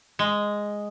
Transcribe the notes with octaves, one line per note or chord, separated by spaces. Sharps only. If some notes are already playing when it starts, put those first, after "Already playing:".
G#3